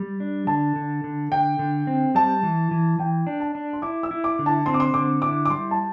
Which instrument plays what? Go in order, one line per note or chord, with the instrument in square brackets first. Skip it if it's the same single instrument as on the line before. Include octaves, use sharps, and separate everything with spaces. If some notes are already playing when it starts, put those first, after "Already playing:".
Already playing: [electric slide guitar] G3
D4
[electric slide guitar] D3 [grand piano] A5
[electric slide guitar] D3
D3
[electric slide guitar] D3 [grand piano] G5
[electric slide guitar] D3
C4
[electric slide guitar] G3 [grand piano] A5
[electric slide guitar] E3
E3
[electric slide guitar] E3 [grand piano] G5
[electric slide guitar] D4
[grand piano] A5
[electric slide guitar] D4
[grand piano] C6
[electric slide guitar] E4 [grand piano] D6
[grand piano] E6
[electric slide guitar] E4
[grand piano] D6
[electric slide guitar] D3
[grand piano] A5
[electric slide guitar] C4 [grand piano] C6
[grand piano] D6
C6
[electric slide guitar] D3 [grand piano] D6
[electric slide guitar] E4 [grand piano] D6
[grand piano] D6
[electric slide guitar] G3 [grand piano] C6
[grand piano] A5